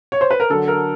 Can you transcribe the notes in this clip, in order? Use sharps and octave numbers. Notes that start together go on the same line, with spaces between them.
C#5
C5
B4
A#4
D3 F#3 A4
A#4